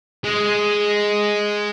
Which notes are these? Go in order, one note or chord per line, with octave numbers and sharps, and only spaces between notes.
G#3